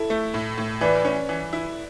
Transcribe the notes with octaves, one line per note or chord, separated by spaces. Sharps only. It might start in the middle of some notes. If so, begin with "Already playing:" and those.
Already playing: E4 A4
A3
A2
A2
E3 B4 D5
C#4
E3
E4